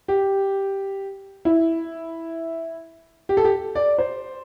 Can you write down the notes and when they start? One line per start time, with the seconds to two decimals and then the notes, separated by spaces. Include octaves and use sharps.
0.08 G4
1.45 E4
3.29 G4
3.37 A4
3.44 G4
3.75 D5
3.98 C5